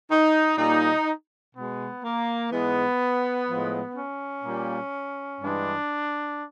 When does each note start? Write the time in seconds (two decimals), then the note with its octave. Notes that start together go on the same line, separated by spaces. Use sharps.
0.10 D#4
0.58 A#2 G3 A#3 D#4
1.54 B2 G#3 B3
2.03 A#3
2.51 G#2 E3 G#3 B3
3.48 A2 F3 G#3
3.96 C#4
4.44 A#2 G3 A#3
5.40 G2 E3 G#3 D4